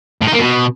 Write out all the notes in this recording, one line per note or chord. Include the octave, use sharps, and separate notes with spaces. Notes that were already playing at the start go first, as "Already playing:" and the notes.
A2
D#4
A#3
B2